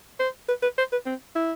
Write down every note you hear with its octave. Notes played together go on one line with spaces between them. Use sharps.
C5
B4
B4
C5
B4
C4
E4